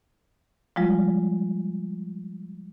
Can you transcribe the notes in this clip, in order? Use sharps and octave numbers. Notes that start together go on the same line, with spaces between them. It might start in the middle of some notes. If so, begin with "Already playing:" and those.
F3 G3 G#3 F4